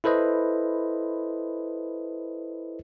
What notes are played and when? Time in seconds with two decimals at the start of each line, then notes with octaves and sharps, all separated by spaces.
0.04 E4 A4 B4 C5 D#5